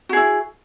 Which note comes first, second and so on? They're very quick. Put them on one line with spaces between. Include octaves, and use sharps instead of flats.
F#4 G#4 E4